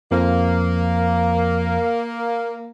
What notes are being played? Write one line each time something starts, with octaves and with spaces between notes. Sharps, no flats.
F2 F3 A#3